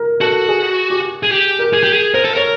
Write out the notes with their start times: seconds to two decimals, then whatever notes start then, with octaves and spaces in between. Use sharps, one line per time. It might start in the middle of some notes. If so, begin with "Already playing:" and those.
Already playing: A#4
0.21 F#4 A4
0.48 G#4
0.90 G4
1.23 G#4
1.31 G4
1.59 A#4
1.73 G#4
1.83 G4
1.93 G#4
2.14 A#4 C5
2.25 A4
2.34 A#4 C#5